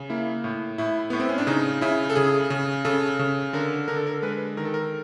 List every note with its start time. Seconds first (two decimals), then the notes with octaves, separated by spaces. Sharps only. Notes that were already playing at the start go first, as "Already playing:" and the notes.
Already playing: C#3
0.10 A#3 E4
0.44 A2
0.78 A2 E4
1.10 A2 B3
1.20 C4
1.29 C#4
1.38 D4
1.47 C#3 D#4
1.81 C#3 E4
2.10 A4
2.16 C#3 G#4
2.50 C#3
2.85 C#3 A4
3.19 C#3
3.53 D3 A#4
3.88 D3 A#4
3.97 A4
4.07 A#4
4.22 G#3 B4
4.57 D#3 A#4
4.65 A4
4.74 A#4